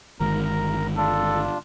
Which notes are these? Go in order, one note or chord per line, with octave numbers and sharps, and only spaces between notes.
G1 D#3 G#3 A#4 A#5
D4 F4 A4